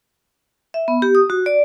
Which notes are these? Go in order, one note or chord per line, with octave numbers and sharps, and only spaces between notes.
E5
B3
G4
D#6
F#4
D5